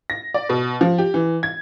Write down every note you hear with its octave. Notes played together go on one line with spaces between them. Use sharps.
A#6
D5
B2
F3
G4
E3
G#6